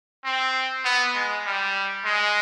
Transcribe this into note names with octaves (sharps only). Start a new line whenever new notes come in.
C4
B3
G#3
G3
G#3